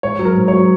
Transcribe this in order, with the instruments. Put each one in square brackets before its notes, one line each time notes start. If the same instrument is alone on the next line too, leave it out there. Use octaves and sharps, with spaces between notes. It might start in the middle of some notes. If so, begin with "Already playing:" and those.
[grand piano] G#2 C#5
F#3
A#4
G#2
C#5
F#3